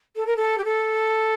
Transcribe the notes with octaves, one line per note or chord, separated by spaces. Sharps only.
A4
A#4
A4
G4
A4